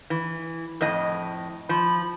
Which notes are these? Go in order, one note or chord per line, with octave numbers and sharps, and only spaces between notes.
E3
F2 A2 D#5
F3 B5